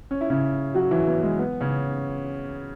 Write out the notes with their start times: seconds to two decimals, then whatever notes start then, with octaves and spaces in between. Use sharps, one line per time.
0.11 C#4
0.21 E4
0.30 C#3 C#4
0.74 F#3 F#4
0.91 E3 E4
1.07 B3
1.22 G#3
1.39 B3
1.60 C#3 C#4